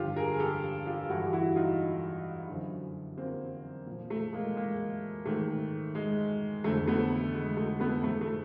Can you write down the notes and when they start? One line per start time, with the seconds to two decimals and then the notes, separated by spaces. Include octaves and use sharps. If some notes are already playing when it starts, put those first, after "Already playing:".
Already playing: G2 D3 F3 F4 G4
0.16 G#4 A#4
0.39 G4 A4
0.86 F4 G4
1.09 G2 E3 E4 F#4
1.25 G4
1.33 E4 F#4
1.56 D#4 F4
2.49 F#2 D3 F3
3.18 A#3 C4
3.87 A#2 F3
4.10 A3
4.33 G#3 A#3
4.56 G#3 A#3
5.25 G#2 D#3 A3
5.95 G#3
6.64 F2 D3 F3 A3
6.87 A3 B3
7.34 G#3
7.57 A3
7.80 A3 B3
8.04 G#2 F3 A3
8.21 A3